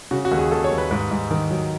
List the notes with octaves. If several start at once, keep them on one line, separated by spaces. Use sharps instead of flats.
C#3 F#4
F#4
D#2
G#4
D#2 A4
C#5
D#2
B4
G#2 B4
G#2
D#3
F#3